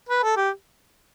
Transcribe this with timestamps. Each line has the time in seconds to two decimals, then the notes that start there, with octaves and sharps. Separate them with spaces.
0.09 B4
0.23 A4
0.36 G4